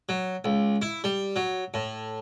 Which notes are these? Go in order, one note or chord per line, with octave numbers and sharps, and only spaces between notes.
F#3
C#2
E4
G3
F#3
A2